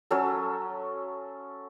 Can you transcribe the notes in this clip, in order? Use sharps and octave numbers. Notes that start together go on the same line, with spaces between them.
F#3 C#4 A4